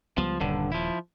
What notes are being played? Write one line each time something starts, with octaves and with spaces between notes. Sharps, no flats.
C#2 F3 G3 B3
D#1 G2 D3
F3 E4